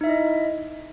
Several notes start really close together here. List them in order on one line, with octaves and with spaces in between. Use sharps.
D#4 E5 E4 D#5